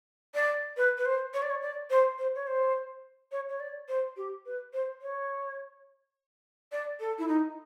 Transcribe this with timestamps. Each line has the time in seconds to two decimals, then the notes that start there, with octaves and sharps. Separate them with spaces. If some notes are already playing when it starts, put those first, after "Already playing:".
0.34 D5
0.77 B4
0.97 B4
1.05 C5
1.34 C#5
1.42 D5
1.50 C#5
1.62 D5
1.90 C5
2.19 C5
2.35 C#5
2.47 C5
3.32 C#5
3.49 C#5
3.60 D5
3.88 C5
4.16 G4
4.45 B4
4.73 C5
5.01 C#5
6.72 D5
7.00 A4
7.18 E4
7.28 D#4